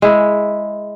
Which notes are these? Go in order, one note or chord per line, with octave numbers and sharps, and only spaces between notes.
G#3 E4